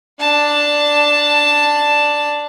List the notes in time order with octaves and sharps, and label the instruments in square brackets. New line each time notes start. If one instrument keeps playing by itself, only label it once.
[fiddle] D4 A5